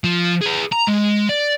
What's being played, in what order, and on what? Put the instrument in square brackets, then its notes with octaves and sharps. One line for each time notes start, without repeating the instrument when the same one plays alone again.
[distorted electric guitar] F3
G#4 B4
A#5
G#3
D5